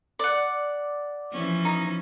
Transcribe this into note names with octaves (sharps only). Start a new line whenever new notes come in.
D5 F#5
E3 F3 C#4
D#4